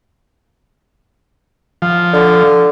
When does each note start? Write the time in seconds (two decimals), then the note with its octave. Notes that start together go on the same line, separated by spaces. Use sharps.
1.82 F3
2.13 D3